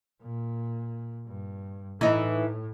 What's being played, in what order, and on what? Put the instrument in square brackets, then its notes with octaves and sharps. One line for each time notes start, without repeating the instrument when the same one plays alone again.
[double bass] A#2
G2
[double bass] A2 [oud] E3 D#4